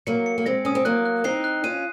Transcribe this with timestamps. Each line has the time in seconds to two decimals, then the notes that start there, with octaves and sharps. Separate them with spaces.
0.07 F#3 A#3 C#7
0.26 C#7
0.38 A#3
0.46 G#3 C4 A#6
0.65 C#4 D#6
0.75 C4
0.85 F#3 A#3 F#6
1.05 F#6
1.24 C4 D#4 C7
1.44 F#6
1.64 C#4 F4 D#7